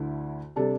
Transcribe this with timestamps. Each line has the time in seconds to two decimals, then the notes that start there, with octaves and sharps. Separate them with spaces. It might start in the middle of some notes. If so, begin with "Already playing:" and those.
Already playing: D2 D3 A3 E4
0.56 C3 G3 D4 A4